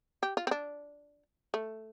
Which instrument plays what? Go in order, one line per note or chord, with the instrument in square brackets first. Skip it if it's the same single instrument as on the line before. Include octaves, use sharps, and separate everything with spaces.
[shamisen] G4
F4
C4
D4
A3